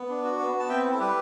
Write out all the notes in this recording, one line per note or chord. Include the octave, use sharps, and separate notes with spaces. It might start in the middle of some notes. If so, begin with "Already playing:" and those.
Already playing: B3
D4
F#4
B3
B3
A5
C4 E5 G5
E4
A4
G3 G4 B4